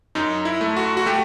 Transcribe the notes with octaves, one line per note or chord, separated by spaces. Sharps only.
F#2 D#4
E4
A3
F#4
F#4
A3 G4